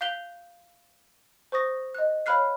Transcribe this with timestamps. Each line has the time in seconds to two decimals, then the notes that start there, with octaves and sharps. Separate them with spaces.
0.01 F5 F#6 G6 B6 F7 G7
1.52 C5 C#6 D#6 A#6
1.95 D#5 F#6
2.26 C#5 F5 B5 F6 F#6 C7